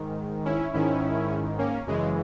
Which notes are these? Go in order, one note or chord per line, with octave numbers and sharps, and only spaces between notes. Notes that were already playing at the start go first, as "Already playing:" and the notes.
Already playing: G#2 D#3
C#4 E4
G#2 D#3 C#4 E4
A#3 C#4
F#2 C#3 E3 G#3